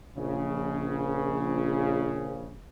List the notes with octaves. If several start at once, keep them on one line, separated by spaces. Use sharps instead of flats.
A#1 C#3